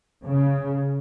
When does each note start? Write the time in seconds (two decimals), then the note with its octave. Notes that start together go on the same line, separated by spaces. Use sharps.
0.25 C#3